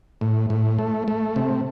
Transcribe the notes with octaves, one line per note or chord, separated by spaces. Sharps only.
A2
A2
A3
A3
C3